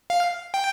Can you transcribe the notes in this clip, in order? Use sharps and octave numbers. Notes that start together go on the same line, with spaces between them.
F5
G5